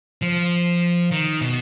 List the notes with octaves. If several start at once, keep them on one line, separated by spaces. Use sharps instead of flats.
F3
D#3
B2